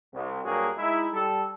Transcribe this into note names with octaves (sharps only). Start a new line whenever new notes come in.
C2
G2 F#3 A#3 F#4 G#4
G#3 D#4 E4
G3 A4